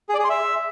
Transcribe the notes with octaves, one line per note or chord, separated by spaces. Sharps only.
G#4
D5
G#4
C6
E5